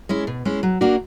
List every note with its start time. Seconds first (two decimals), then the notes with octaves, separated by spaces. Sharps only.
0.09 G#3 C#4 E4
0.27 B2
0.45 G#3 C#4 E4
0.63 F#3
0.81 A#3 D4 F#4 A#4